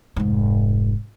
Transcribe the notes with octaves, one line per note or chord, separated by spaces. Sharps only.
F1 G#2